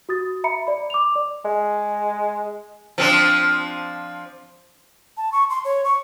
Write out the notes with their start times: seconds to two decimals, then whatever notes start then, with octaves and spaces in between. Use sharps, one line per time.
0.09 F#4 D#6 A6
0.44 E5 A#5 B5 C#7
0.67 D5 B5
0.90 D6 F7
1.16 D5
1.45 G#3
2.98 F3 C4 D4
5.17 A5
5.32 C#6
5.50 C6
5.65 C#5
5.84 C#6